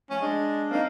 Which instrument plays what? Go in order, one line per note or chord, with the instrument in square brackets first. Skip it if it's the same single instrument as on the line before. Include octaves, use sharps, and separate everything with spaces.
[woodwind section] F3 A3 [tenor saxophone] C#4
[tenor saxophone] G#3 [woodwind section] D4
[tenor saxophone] A#3 [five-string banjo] C4 D#4